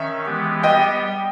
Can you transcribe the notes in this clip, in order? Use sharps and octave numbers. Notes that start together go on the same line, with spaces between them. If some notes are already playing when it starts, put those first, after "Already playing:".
Already playing: D#3 C#4 E5
E3 G#3 B3 G4
G3 B3 G4 D#5 G5